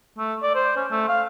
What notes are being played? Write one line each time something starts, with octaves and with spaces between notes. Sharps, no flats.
A3
D5
C5
C#4
A3
F5